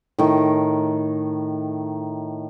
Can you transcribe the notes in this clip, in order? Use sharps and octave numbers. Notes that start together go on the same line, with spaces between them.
A2 D#3